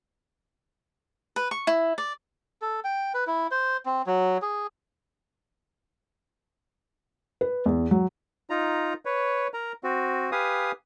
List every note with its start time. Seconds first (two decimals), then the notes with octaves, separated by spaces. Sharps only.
1.36 B4
1.51 C#6
1.67 E4
1.98 D5
2.62 A4
2.84 G5
3.14 B4
3.27 E4
3.51 C5
3.86 C4
4.07 F#3
4.42 G#4
7.41 B4
7.66 E2
7.91 F#3
8.50 D#4 F4 A#5
9.05 B4 C#5
9.54 A#4 A#5
9.84 C4 F#4
10.32 G4 B4 F5 G#5 D#6